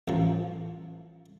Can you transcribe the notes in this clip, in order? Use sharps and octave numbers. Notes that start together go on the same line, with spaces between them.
A1 F3